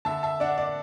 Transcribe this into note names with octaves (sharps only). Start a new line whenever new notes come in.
D3 E5 A5
E5 A5
D4 D5 F#5
D5